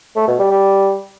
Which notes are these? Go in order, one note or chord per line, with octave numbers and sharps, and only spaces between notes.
A3
B2
G3
G3